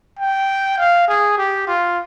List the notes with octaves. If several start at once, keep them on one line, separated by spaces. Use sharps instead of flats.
G5
F5
G#4
G4
F4